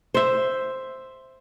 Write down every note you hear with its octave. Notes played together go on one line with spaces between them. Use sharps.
C5 E5